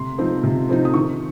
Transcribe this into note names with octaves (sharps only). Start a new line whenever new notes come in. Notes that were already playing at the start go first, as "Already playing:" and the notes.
Already playing: C3 C6
F3 C4 D#4
C3
F3 C4 D#4
D#6
D#3 C#6